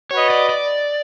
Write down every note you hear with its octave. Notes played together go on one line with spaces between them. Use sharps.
F#4 B4 C#5 D#5
D5
D5